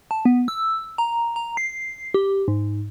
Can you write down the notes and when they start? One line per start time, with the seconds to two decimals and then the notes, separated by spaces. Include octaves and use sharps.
0.11 A5
0.25 B3
0.48 E6
0.98 A#5
1.36 A#5
1.57 C7
2.14 G4
2.48 G#2